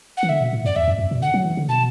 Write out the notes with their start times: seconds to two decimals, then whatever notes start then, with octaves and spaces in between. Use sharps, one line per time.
0.17 F#5
0.23 E3
0.29 D3 E5
0.41 B2
0.53 A2
0.65 F#2 D5
0.76 E2 E5
0.88 F#2
0.99 F#2
1.11 B2
1.22 D3 F#5
1.34 F#3
1.45 E3
1.57 D3
1.69 B2 A5